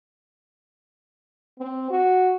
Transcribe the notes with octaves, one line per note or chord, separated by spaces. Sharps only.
C4
F#4